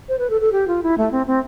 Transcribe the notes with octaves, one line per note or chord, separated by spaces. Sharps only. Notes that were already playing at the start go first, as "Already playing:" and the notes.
C5
B4
A4
A4
G4
F4
E4
A3
C4
C4